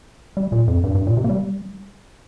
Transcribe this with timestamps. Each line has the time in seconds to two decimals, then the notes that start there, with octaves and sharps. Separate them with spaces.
0.37 G3
0.52 A#2
0.68 F2
0.84 G2
0.95 G2
1.07 A#2
1.17 C3
1.24 A#3
1.30 G3